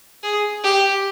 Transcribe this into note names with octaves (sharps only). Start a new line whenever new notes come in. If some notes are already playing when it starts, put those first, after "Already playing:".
G#4
G4